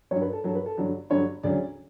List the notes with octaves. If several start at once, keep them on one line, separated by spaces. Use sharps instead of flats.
G2 F#3 C#5
B4
A4
G2 F#3 A4
B4
A4
G2 D3 F#3
G2 D3 F#3 C#5
D2 C#3 F#3 D5